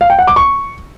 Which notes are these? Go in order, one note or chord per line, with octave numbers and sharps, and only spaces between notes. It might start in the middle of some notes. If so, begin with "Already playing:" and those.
F5
G5
F#5
D6
C#6